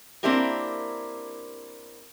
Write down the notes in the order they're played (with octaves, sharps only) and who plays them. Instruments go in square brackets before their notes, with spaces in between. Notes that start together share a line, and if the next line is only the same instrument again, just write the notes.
[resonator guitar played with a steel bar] A#3 C4 D4 E4 G4 A#4